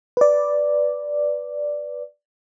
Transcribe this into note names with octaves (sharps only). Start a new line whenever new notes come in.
B4 D5